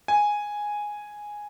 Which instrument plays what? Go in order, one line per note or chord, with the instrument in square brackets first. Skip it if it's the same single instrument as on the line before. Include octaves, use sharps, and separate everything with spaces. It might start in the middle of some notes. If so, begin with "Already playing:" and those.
[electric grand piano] G#5